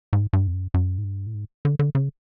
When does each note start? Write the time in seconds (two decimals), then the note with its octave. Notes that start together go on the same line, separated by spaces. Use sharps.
0.13 G#2
0.33 G2
0.47 F2
0.53 F#2
0.74 F#2
0.98 G#2
1.04 G2
1.27 A2
1.34 G#2
1.65 D3
1.79 D3
1.95 C#3